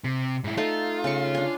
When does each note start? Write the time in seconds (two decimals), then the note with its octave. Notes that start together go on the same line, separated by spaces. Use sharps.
0.04 C3
0.44 G#2 E4
0.57 A3 D#4 F4 A4
1.04 C#3 C#6
1.35 D4 G#5